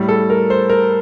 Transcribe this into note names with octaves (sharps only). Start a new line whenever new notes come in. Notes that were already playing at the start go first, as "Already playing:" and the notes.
Already playing: A2 G3
A4
A#4
C5
A#4